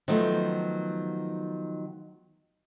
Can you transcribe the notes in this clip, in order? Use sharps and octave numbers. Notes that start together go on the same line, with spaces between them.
D#3 F3 F#3 A3 B3